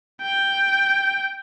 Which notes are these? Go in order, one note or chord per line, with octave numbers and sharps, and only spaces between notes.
G5